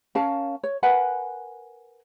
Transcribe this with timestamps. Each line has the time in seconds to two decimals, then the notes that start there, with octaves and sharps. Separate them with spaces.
0.15 C#4 A#4 F5 A5
0.63 C#5
0.83 A#4 B4 F#5 G#5